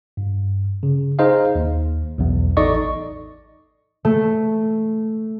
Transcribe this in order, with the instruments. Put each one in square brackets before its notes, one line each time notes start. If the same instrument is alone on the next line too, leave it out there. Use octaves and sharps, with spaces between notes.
[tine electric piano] G2
C#3
D#4 G#4 C5 D#5 F5
D#2
B1 E2
A1 D#4 A4 D5 D#5 C#6
[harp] A3